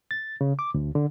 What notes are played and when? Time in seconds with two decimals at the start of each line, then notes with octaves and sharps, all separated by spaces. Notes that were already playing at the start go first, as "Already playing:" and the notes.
0.11 A6
0.41 C#3
0.59 D6
0.74 D2
0.95 D3